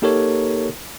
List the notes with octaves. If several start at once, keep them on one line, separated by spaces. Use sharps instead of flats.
A#3 D#4 G4 A4 A#4 C#5